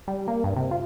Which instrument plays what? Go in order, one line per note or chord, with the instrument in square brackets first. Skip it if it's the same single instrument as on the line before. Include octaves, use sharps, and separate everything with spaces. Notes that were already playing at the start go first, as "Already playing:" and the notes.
[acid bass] G3
A#3
G2
C3
F4